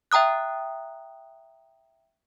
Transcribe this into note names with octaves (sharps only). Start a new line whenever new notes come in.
E5 G5 A#5 D#6 F#6